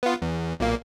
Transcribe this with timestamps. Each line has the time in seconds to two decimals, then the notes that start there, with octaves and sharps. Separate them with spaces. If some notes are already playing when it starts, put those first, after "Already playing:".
0.03 B3 F4
0.22 E2
0.60 B1 A#2 A#3